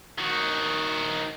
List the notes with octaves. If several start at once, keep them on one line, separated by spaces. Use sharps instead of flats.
D#3 F#4